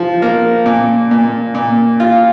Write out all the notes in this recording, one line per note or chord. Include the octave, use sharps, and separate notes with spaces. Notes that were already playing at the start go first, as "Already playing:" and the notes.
Already playing: F3
A#3
A#2
A#2
A#2
F4